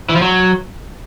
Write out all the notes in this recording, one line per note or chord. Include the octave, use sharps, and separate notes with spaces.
E3
F3
F#3